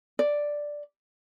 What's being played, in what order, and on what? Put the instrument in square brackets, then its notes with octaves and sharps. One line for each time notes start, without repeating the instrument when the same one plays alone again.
[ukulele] D5